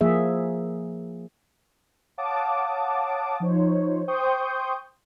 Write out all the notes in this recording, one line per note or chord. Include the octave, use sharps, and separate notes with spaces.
F3 A#3 G#4 E5
C#5 F5 F#5 A5 D6 D#6
F3 D#4 C5 C#5
C5 G5 C6 C#6 D#6 G6